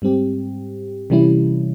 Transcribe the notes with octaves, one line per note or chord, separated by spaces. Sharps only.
G#2 G3 C4 G4
C3 E3 G3 C#4 E4